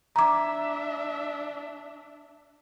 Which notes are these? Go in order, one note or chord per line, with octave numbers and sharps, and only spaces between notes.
D4 E5 A#5 D6